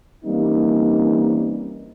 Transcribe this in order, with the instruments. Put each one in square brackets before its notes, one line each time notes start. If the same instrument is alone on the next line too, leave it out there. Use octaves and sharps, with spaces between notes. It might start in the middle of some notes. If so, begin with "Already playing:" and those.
[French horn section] E3 G3 A#3 C4 C#4 D#4